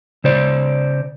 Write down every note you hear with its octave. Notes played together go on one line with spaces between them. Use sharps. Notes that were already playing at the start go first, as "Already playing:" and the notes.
C#3 C5 D5